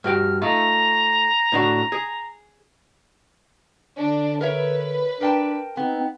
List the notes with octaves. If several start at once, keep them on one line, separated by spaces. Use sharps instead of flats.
G2 F#4 G5 F6
A3 D#4 F4 A#5
A2 D4 F#4
G#4
D3 D4
A#4 B4 C#5 E5
D4 A#4 G5 A5
B3 C4 D#4